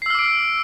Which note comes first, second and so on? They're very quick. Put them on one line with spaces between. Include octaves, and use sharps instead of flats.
C7 E6 F6 D6 D7